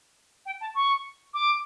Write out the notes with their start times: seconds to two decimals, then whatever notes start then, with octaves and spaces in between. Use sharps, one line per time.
0.46 G5
0.61 A5
0.75 C#6
1.34 D6